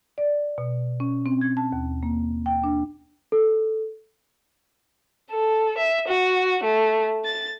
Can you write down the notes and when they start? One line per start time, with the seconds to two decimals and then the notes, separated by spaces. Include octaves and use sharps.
0.18 D5
0.58 B2
1.00 C#4
1.26 C4
1.41 G#6
1.57 A5
1.72 D#2
2.03 A#3
2.46 G5
2.64 D4
3.32 A4
5.30 A4
5.77 E5
6.07 F#4
6.63 A3
7.24 A6